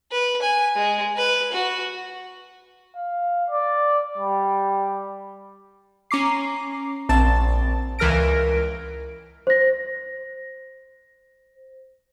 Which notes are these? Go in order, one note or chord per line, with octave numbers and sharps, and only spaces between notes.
B4
G#5
G#3
B4
F#4
F5
D5
G3
C#4 A#5 D6 C7
A#1 C4 A5 A6
C#2 E3 A#4 F6 A#6 D7
C5 A#6